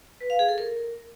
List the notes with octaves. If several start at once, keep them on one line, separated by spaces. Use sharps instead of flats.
B4
F5
G#4
A4
A#4